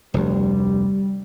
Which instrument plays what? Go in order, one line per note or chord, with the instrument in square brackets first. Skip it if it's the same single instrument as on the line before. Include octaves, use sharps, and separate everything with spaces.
[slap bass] F1 D2 [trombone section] G3